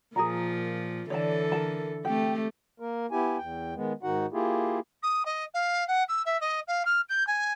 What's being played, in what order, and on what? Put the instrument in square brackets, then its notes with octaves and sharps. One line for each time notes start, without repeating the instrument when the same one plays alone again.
[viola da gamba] A#2 F3 [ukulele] G#4 A#4 A#5
[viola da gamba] D3 E3 A4 [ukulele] C#5 D5 A5
[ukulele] A#4 A5
[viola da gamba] A3 C4 G4 [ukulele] G5
[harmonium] A#3 A#4
B3 E4 G4 G#5
E2 G5
D#3 G#3 B3
G#2 D#3 D#4 F#4 F#5
A#3 E4 F4 G4 G#4
[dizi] D#6
D#5
F5
F#5
E6
E5
D#5
F5
F6
G6
G#5